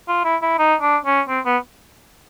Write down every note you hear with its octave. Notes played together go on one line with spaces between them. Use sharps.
F4
E4
E4
D#4
D4
C#4
C4
B3